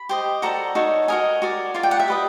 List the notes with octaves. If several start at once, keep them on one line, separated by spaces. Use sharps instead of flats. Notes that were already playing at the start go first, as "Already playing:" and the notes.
Already playing: B5
G4 C5 D#5
F#4 A4 D5 A#5
D#4 F#4 A4 C#5
F#4 A#4 D#5 G#5
F#4 A#4 D5
F4 A#4 D5
G5
F#5
E5
G4 B4 D#5